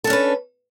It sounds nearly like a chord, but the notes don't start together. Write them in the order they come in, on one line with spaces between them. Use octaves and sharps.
A4 D4 C#4 B4